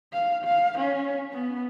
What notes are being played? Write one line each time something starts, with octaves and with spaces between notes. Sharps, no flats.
F5
F5
C#4
B3